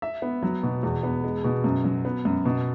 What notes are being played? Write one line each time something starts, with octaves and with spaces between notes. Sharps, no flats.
E5
B3
F#3
B2
E2
B3
G#3
B2
F#2
F#3
B3
F#2
B2